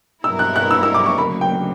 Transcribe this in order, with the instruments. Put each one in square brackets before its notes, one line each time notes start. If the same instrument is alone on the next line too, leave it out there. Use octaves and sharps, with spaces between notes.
[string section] G2 F#3 B3 E4 A#4 [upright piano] E6
[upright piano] F#6
F#6
E6
E6
D6
C#6
[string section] D2 C#3 F#3 A#3 [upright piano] B5
[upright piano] G5